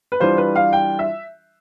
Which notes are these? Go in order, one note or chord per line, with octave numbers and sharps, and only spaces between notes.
B4
E3 G3 D4 F4 C5
B4
F5
G5
E5